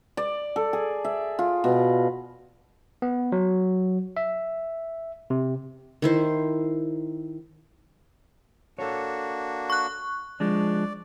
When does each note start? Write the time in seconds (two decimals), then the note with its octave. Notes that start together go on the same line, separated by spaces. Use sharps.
0.17 D5
0.56 A4
0.73 G#4
1.05 E5
1.39 F4
1.64 B2
3.02 B3
3.32 F#3
4.17 E5
5.30 C3
6.02 D#3 E4 C5
8.79 A#3 D4 F#4 A4 C#5
9.70 C#6 F#6
10.40 F3 G#3 D4 D5